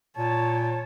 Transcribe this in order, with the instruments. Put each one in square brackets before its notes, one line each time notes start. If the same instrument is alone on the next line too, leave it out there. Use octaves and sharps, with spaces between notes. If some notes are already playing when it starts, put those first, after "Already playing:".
[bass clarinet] A#2 [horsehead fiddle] C#5 A5